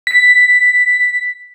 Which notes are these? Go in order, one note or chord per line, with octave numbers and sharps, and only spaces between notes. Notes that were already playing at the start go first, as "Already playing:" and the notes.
B6